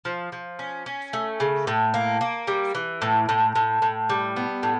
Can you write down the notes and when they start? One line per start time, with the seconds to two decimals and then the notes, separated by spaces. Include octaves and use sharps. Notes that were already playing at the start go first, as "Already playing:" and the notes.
0.05 F3
0.32 F3
0.59 C#4
0.86 C#4
1.13 A3
1.40 C#3
1.67 A2
1.94 A#3
2.21 A#3
2.47 G3
2.75 E3
3.02 A2
3.29 A2
3.56 A2
3.82 A2
4.10 G3
4.36 B3
4.63 A2